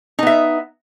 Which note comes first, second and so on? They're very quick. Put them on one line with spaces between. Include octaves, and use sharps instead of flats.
D#4 B3 E5